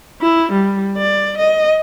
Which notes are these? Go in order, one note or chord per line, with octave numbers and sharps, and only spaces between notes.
E4
G3
D5
D#5